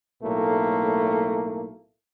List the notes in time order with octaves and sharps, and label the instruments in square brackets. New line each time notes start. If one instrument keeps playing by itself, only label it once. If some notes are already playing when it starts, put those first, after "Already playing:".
[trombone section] B1 A2 A3 A#3